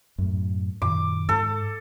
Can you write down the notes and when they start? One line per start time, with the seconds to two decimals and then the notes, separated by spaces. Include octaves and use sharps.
0.18 F#2 A2
0.82 F#2 A#2 D#3 D6
1.29 G#2 A4